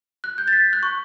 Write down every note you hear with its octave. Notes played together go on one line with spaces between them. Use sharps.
F#6
G6
A6
B6
F#6
C#6